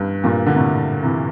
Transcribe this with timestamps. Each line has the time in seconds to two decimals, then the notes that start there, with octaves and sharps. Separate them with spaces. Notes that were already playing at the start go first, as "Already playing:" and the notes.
Already playing: G2
0.24 G2 A#2
0.46 D3
0.56 A2 C3
1.03 C3 E3